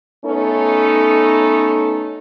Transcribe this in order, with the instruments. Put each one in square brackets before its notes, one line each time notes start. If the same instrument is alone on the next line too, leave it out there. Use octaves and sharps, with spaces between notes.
[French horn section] A3 B3 C#4 D#4 A4